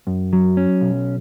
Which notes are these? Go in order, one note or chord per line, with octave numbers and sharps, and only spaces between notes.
F#2
F#3
C#4
B1